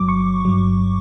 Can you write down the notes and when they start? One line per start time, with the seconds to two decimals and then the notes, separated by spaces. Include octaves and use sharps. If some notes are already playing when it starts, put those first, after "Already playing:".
Already playing: G1 G2 F#3 D6
0.09 C#6
0.45 G1 G2 F#3